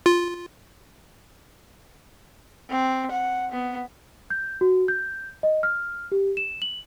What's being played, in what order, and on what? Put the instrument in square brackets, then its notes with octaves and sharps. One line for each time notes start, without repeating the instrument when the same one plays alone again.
[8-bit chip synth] F4
[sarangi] C4
F#5
B3
[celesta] G6
F#4
G6
D#5
F6
G4
E7
F#7